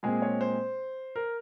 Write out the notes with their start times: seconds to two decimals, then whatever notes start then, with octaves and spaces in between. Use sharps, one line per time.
0.03 A#2 G#3 C4 G#4
0.22 C#5
0.41 C5
1.16 A#4